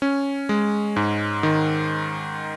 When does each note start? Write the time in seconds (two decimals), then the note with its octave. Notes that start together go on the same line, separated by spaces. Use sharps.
0.02 C#4
0.49 G#3
0.96 G#2
1.43 D#3